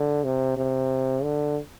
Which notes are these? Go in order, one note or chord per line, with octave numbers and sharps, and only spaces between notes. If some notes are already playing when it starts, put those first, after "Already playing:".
Already playing: D3
C3
C3
D3